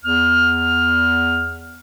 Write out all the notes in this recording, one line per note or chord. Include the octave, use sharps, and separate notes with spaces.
E2 F6